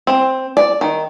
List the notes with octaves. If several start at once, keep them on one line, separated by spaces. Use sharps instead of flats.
C4
D5
D#3